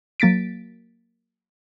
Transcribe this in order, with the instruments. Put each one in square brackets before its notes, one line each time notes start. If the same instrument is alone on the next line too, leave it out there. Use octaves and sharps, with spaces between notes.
[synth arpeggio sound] F#3 A#3 A6 B6 D7